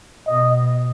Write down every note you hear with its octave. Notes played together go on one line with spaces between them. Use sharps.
B2 D#5